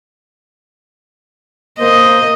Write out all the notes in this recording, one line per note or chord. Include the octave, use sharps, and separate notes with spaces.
A#3 C5 D#5